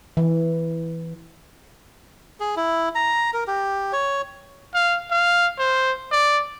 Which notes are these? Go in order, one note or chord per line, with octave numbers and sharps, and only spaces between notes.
E3
G#4
E4
A#5
A#4
G4
C#5
F5
F5
C5
D5